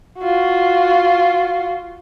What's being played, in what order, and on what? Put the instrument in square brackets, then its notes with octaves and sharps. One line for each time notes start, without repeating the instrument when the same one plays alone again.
[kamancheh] F4 F#4